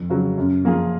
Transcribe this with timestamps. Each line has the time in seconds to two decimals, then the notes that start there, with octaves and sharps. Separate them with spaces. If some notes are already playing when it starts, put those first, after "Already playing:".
Already playing: F2
0.10 C#3 F#3
0.37 F#2
0.64 F3 A#3 F4 G#4